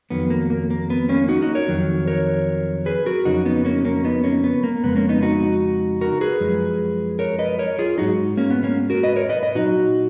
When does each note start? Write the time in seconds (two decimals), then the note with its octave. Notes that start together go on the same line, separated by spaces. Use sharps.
0.10 F2 D#3 F#3 B3
0.30 A#3
0.50 A#3
0.71 A#3
0.90 B3
1.09 A#3 C#4
1.29 D#4 F#4
1.42 D#4 F#4
1.55 A#4 C#5
1.68 F2 D#3 F#3
2.07 A#4 C#5
2.86 G#4 B4
3.06 F#4 A#4
3.25 F2 C#3 F#3 D#4 F#4
3.46 B3 D#4
3.65 A#3 C#4
3.85 A#3 C#4
4.05 B3 D#4
4.24 A#3 C#4
4.44 B3
4.64 A#3
4.83 F2 C#3 G#3 B3
4.96 A#3 C#4
5.09 B3 D#4
5.23 D#4 F#4
6.01 F#4 A#4
6.21 G#4 B4
6.40 F#2 F3 G#3
7.19 A#4 C#5
7.39 B4 D#5
7.59 A#4 C#5
7.79 F4 G#4
7.98 G#2 F#3 D#4 F#4
8.37 A#3 C#4
8.50 B3
8.63 A#3 C#4
8.90 F#4 A#4
9.03 B4 D#5
9.16 A#4 C#5
9.29 B4 D#5
9.43 B4 D#5
9.55 A#2 F#3 D#4 F#4